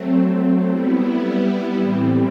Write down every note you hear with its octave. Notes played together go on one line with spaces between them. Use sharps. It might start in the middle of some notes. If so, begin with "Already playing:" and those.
Already playing: F#3 A3 C4
G3 B3 E4
A2 E3 G3 C4